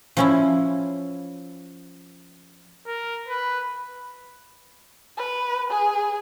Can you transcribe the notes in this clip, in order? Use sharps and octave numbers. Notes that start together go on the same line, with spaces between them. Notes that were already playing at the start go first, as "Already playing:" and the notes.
F3 C#4 E4
A#4
B4
B4
G#4